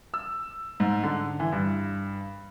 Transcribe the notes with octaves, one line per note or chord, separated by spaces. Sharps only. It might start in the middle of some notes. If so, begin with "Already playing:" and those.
E6
G#2
D3
E3
G2